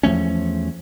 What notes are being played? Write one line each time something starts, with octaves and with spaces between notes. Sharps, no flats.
E2 F3 A3 C#4